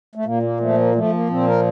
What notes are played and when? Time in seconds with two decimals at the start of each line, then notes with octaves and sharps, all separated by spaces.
0.15 A3
0.25 A#2 A#3
0.43 A#3
0.60 F3 A3
0.78 A#3
0.95 F3 A3
1.12 A#3
1.29 A#2 C4
1.47 A#4